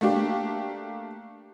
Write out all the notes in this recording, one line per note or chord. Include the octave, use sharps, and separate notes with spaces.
A3 A#3 D4 G4